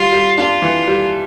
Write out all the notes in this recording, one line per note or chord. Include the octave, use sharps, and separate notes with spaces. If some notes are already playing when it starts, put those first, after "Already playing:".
Already playing: G3 F4
G3
D4 F4
E3
G3